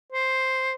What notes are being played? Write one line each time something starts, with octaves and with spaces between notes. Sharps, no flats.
C5